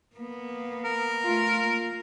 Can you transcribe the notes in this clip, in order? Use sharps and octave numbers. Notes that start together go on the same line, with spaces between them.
A#3 B3
A#4
A3 F4
A#3